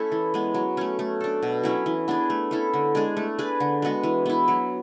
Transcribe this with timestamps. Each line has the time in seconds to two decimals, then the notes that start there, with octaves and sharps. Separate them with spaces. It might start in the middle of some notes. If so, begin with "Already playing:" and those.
Already playing: A3 C#4 E4 A4
0.12 E3
0.34 G#3 B3
0.55 F#3
0.77 A3 C#4
0.99 A3
1.21 D4 A4
1.43 B2
1.63 F#3 C#4 E4
1.86 E3
2.08 B3 D4 G#4
2.30 A3
2.51 C#4 E4 A4
2.74 D3
2.95 G#3 D4 G#4
3.17 A3
3.39 D4 G#4 B4
3.60 D3
3.82 G#3 B3 F#4
4.03 E3
4.26 B3 E4
4.48 F#3